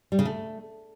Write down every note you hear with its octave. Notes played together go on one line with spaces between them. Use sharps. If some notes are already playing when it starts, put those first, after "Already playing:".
G3
C#3
A3